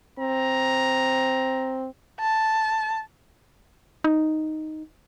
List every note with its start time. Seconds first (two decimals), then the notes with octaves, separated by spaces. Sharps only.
0.19 C4 A#5
2.20 A5
4.04 D#4